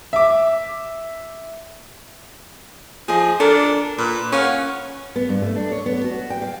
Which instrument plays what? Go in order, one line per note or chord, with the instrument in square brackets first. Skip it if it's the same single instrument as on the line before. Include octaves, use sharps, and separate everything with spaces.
[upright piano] E5 D6
[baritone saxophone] F3 [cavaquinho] G#4 D#5
[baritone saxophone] D4 [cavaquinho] A4 A#4
[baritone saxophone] A#2 [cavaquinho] B4
[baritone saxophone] C#4 [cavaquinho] C#5 F5 F#5
[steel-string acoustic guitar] B3
G2
A3
D4
C#5
B3
F#4
G5
F5